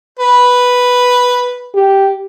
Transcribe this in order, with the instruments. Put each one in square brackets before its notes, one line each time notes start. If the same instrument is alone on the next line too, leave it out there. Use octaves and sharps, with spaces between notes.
[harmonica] B4
[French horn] G4